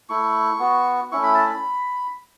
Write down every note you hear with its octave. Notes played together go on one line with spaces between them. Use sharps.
A3 E4 C#6
B3 F#4
A3 C#4 E4 C#6
B5
A5
B5